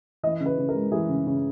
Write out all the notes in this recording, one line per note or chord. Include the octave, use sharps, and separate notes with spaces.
E3 D#5
C#3
B4
C#3
A#4
G#3
E3 G#4
C#3
C#3